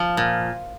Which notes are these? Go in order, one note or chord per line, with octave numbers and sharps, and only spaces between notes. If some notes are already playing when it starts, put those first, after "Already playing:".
Already playing: F3
A#2